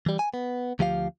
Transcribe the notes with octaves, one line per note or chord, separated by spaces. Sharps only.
E3 G3
G#5
B3
D2 F3 G4 E5 F5